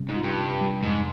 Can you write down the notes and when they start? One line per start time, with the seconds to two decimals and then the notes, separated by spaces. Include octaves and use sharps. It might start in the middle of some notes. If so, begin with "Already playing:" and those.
Already playing: C3 G3 C#4
0.09 G#2
0.16 F4
0.24 G2
0.38 C3
0.61 G3
0.83 F2 G#2